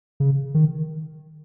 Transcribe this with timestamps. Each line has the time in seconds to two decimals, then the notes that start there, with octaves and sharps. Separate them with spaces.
0.20 C#3
0.54 D#3